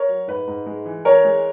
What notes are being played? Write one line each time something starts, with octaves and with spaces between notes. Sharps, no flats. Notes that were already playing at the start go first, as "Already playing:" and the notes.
Already playing: A#4 C#5
F#3
G#2 B4
G#2
G#3
E3
E3 A#4 C#5
G#3